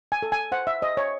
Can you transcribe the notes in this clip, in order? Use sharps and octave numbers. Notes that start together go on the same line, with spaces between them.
G#5
A4
G#5
C5 F#5
E5
C5 D#5
C#5